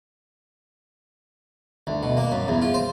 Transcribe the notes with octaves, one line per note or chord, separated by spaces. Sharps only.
D2
B2
A#3
F#2
E2
F4
C5